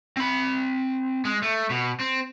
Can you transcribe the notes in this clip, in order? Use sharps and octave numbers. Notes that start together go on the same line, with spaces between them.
C4 B5
G#3
A3
B2
C4